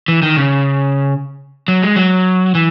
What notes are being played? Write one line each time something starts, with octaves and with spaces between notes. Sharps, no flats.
E3
D#3
C#3
F#3
G#3
F#3
E3